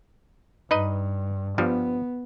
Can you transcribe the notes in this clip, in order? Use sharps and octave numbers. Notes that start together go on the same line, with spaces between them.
G2 D#4 B4 D#5
G2 F3 G3 B3